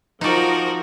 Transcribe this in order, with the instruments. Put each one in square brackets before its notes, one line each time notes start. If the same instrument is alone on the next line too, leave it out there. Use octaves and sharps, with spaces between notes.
[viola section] F3 [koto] D#4 D5 [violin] F#4 A#4